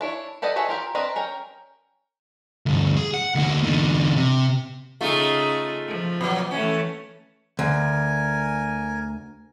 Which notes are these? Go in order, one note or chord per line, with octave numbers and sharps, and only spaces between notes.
D4 E4 C#5
G4 A4 B4 D5 D#5
G#4 A4 B4 C#5 E5
F4 G4 A#4
C4 D4 A#4 B4 D#5
C#4 A#4 G5
D2 G2
G#4
F#5
D2 A#3
E2 D3
C3
C#3 A3 D#4 F4 G#4
F3
A#2 F#3
E3 A3 C#4
D2 A#4 G#5